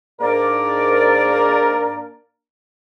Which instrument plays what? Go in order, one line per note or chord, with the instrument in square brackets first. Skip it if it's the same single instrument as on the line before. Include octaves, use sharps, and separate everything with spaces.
[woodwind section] G#2 D5 [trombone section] A#3 D4 A#4